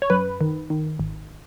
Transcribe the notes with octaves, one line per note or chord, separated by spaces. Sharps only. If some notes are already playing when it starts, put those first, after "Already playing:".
C#5
F#2 B4
D#3
D#3
G#1